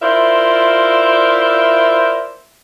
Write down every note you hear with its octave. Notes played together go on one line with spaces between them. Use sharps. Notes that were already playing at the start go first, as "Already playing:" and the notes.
E4 F4 A#4 C5 D5 E5